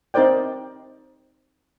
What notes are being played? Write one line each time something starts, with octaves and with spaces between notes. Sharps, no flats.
C4 D#4 A#4 C5 D5 G5